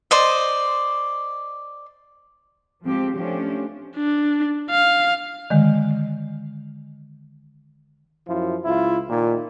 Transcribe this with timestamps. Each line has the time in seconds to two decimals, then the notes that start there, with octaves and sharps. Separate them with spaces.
0.11 C5 D5 D#5
2.84 F3 G#3 C4 G4
3.17 F3 A3 C#4 D4 G4
3.97 D4
4.71 F5
5.50 D3 D#3 G#3
8.28 F#2 F3 E4
8.65 C#2 E4 F4
9.08 A#2 D#3